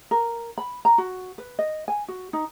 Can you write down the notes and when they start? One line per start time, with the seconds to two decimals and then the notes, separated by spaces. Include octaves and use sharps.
0.11 A#4
0.58 B5
0.85 A#5
0.98 F#4
1.38 B4
1.59 D#5
1.88 G#5
2.08 F#4
2.33 D#4